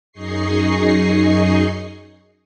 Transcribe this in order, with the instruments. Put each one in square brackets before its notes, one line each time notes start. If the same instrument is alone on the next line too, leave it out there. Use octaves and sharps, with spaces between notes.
[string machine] F#2 D#4 G#4 D#5 C#6 C7